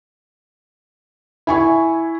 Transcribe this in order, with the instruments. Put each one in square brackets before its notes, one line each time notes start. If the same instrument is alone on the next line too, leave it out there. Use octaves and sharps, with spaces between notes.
[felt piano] E4 G#5 C#6